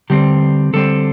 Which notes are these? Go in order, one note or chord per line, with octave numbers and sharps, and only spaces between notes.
D3 G3 C4 G4
D3 G3 C4 A4